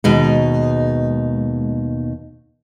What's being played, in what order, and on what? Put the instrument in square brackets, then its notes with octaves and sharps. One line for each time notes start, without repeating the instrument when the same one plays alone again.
[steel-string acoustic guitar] D#2 B2 D#4 [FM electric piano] G#3